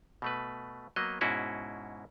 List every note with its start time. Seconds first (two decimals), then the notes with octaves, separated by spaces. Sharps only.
0.22 B2 A3 B4
0.96 F#3 A#3 B3 D#5
1.21 G#2 B2 C#4 E4 F#4 G#4